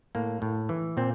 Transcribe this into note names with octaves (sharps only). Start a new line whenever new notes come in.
A2 A#3
A2
E3
A#2 C4